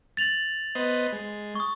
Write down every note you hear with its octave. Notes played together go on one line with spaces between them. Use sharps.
A6 F7 F#7
B3 C5 D#5
G#3
C#6 D#6